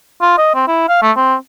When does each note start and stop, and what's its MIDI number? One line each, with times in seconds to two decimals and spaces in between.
0.21 0.36 65
0.38 0.53 75
0.55 0.64 60
0.67 0.86 64
0.88 1.00 77
1.02 1.11 57
1.16 1.35 60